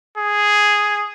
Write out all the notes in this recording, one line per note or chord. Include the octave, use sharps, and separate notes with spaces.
G#4